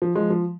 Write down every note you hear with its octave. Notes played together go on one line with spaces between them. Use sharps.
F3
F3 G#3
F3